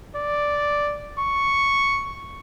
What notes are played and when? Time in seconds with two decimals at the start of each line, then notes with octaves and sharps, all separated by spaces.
0.16 D5
1.19 C#6